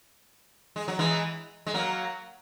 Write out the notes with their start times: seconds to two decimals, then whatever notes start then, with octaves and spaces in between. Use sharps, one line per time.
0.76 G#3
0.88 F#3
0.99 E3 G#3
1.67 G#3
1.74 F#3 A#3